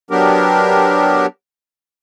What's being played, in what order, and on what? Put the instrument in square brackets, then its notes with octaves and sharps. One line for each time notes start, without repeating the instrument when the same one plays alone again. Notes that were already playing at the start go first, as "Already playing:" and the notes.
[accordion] F#3 B3 D4 G4 A#4